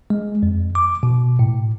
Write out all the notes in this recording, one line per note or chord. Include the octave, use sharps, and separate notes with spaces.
G#3
F2
D6
B2
A2